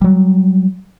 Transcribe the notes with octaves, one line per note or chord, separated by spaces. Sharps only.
F#3 G3